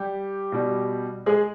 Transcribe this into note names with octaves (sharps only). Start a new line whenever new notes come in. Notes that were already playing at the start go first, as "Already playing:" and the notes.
Already playing: G3 G4
B2 G3
G#3 G#4